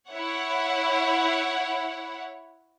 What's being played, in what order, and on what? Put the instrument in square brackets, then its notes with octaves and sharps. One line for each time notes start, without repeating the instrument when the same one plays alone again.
[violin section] E4 C#5 F#5